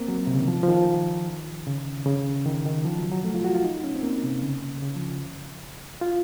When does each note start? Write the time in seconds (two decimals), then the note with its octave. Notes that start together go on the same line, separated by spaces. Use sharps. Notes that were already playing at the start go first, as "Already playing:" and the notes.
Already playing: A#3 C4
0.08 F#3
0.27 C3
0.34 C#3
0.40 D#3
0.48 F3
0.63 F3
0.68 D#3
1.67 C#3
2.06 C#3
2.46 D#3
2.66 D#3
2.85 F3
2.99 F#3
3.12 F#3
3.24 A3
3.34 F4
3.45 F#4
3.54 F4
3.64 D#4
3.84 C#4
3.95 C4
4.03 A#3
4.23 C3
4.43 C#3
4.82 C#3
4.96 F3
6.01 F4